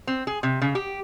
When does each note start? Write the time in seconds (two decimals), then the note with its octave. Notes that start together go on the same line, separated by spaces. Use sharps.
0.07 C4
0.27 G#4
0.43 C3
0.61 C#3
0.75 G4